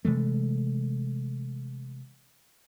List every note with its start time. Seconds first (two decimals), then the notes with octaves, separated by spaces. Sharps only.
0.05 C3 E3 G#3 A3